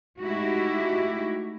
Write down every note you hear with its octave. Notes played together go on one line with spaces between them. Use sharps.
G#3 A3 D#4 E4 F#4 G4